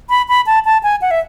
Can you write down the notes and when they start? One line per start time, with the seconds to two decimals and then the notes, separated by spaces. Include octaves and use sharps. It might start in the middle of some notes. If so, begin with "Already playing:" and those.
0.10 B5
0.28 B5
0.46 A5
0.65 A5
0.83 G#5
1.02 F#5
1.11 E5